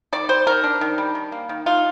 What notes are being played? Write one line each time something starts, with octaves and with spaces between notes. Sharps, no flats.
D#3 D5
G3 C5
D#3 A#4
D4
D#3
G3
D#3
A#3
D#3
D#4 F4